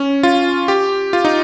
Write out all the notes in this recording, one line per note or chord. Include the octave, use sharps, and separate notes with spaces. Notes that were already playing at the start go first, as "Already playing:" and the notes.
Already playing: C#4
F4
G4
F4
D#4